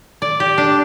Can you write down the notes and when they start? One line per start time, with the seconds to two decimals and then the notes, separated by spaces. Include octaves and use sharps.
0.22 D5
0.40 G4
0.58 D4